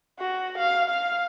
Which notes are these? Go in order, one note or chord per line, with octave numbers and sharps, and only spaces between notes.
F#4
F5
F5